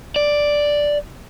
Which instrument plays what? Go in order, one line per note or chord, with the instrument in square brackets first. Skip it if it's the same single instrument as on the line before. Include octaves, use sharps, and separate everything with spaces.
[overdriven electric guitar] D5